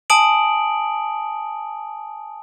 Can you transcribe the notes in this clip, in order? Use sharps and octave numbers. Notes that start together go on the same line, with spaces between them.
G#5 A5 D#6 D7 F#7